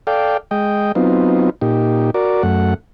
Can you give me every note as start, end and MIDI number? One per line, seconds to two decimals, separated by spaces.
0.07 0.37 69
0.07 0.37 74
0.07 0.37 77
0.07 0.37 79
0.51 0.92 56
0.51 0.92 75
0.51 0.92 79
0.95 1.50 54
0.95 1.50 59
0.95 1.50 60
0.95 1.50 63
0.95 1.50 65
1.61 2.11 46
1.61 2.11 63
1.61 2.11 67
2.14 2.43 66
2.14 2.43 70
2.14 2.43 74
2.43 2.74 42
2.43 2.74 57
2.43 2.74 78